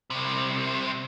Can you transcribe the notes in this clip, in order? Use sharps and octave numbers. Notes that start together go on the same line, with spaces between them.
C2 C3